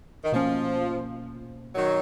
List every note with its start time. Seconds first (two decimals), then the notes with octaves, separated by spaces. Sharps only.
0.24 D#3
0.32 B2 F3 A#3 C#4
1.75 D#3 F#3